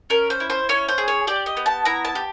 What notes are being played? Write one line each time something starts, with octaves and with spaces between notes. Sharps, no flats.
C#4 A#4
C5
E4
C5
C#4 C#5
C5
G#4
C#5
G4 D5
D#5
B3
A5
E4 A#5
A5
G4